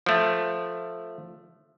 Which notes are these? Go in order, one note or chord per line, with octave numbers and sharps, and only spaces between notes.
F3 A3